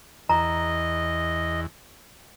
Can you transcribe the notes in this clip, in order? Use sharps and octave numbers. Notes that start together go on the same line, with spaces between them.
E2 D#5 A#5